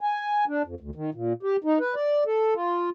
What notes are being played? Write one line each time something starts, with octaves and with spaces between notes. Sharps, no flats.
G#5
D4
F2
D2
D#3
A#2
G4
D#4
B4
D5
A4
F4